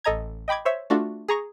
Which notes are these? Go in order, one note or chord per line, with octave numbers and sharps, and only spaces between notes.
A1 A4 D#5 A#5 G#6
D#5 G5 B5 D6 G#6
C5 C#5 E5
A3 D4 F4 F#4
G#4 A#5 C#6 A#6